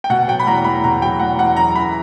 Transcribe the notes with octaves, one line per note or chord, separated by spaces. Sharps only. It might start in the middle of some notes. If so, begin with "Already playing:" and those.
G5
B2 F#5
F#3 G5
B5
E2 A#5
E2 B5
B2 A#5
F#3 G5
E2 F#5
E2 F#5
F#2 A#5
E3 B5